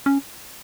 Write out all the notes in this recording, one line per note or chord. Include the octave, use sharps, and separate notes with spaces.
C#4